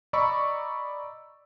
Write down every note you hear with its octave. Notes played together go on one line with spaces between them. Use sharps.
D5 D#5 A#5 B5 C#6 E6